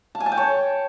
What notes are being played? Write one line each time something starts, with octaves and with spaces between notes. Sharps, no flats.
A5
G#5
A5
G5
C#5